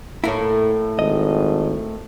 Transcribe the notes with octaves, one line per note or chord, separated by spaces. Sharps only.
A2 A3 A#3 E4 A#4 C#5
G#1 D#5